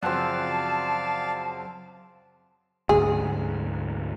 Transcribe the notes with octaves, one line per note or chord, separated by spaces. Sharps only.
F#2 C#3 F3 C4 D5 F5 F#5 A5
D2 G#2 D3 G#4